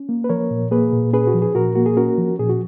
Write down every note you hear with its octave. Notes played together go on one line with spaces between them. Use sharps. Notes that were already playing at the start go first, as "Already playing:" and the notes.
Already playing: C#4
A#3
B4
F3 A#4 C#5
A#2
A#3 G#4 B4
A#2
C#4 G#4 B4
F#4
F3
G#4
A#2 F#4 A#4
A#3 F#4
G#4
C#4 F#4 A#4
F3
A#2 G#4
F#4